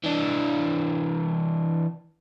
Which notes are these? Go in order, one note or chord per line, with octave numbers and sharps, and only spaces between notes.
E3 D4